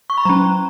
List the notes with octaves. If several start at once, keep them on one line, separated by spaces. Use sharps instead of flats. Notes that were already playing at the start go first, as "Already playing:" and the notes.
C#6
B5
F#3 C#4 A#5